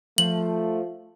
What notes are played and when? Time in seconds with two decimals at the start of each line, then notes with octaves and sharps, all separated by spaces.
0.18 F3 A3 F#7